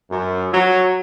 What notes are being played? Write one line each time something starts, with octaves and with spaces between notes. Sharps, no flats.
F#2
F#3